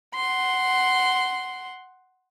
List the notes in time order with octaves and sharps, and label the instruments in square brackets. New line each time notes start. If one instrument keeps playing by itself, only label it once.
[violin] F#5 C6